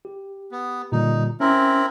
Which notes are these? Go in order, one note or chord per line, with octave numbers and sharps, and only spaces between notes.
G4
B3
A#2 D3 G3 D#4
C4 C#4 E4 A#4